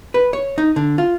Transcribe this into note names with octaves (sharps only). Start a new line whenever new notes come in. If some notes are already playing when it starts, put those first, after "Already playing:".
B4
C#5
D#4
D3
F4